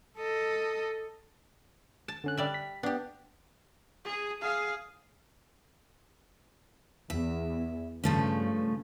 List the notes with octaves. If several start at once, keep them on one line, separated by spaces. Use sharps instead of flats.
A4 D#5
A5
D3 C#4 F#6
G3 D5 E5
B6
B3 D4 G4
G#4
G#4 F5
E2 E5
G2 C#3 F3 A3 C#4